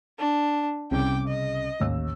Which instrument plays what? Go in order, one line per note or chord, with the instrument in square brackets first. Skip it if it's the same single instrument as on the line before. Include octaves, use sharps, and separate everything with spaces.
[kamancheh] D4
[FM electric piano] C2 C#3 [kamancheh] G5 D6
[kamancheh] D#5
[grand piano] A1 D#2 E6